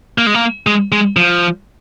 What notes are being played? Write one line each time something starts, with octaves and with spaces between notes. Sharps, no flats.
A#3
G#3
A#3
G#3
G#3
F3